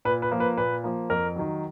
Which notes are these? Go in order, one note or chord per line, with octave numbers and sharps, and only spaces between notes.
A#2 B4
B4
F3 A#3
B4
A#2 B4
F3 A#3
F2 A#4
D#3 F#3